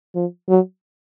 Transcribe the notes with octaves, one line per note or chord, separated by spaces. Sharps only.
F3
F#3